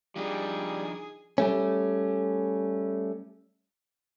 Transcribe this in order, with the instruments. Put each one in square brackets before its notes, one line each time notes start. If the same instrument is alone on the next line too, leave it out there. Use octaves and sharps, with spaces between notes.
[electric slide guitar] F3 D4 D#4 [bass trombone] G3 [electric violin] G#4
[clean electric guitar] G3 A3 C#4